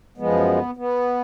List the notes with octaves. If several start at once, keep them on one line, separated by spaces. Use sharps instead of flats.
F#2 F3 G#3 B3
B3